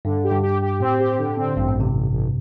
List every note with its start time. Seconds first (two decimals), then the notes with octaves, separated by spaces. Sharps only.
0.05 G2 D3
0.24 G4
0.31 G2
0.43 G4
0.62 G4
0.80 A2 C4
0.99 G4
1.19 D3
1.37 C4
1.56 A1 G2
1.68 A2
1.75 A1
1.80 C3
1.94 A1
2.12 A1